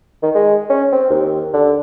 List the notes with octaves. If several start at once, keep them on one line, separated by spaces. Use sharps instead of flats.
D#3
G#3
C#4
C4
D#2
D3